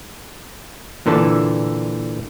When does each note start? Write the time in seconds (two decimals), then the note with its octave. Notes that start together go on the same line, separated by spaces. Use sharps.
1.06 A#2 D3 E3 A4 A5